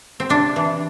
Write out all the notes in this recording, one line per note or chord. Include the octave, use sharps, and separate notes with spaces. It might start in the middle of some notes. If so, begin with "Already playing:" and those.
C4
C3 D4
E3